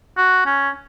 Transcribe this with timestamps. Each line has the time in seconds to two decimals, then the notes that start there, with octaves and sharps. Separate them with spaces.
0.18 F#4
0.46 C#4